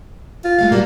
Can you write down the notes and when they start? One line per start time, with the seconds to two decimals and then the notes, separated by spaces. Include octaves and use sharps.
0.44 F4
0.59 G#3 A3 F5
0.71 A#2 G3 A#3 F#4